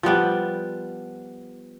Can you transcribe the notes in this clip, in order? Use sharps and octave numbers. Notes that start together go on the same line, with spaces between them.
F3 G3 B3 G5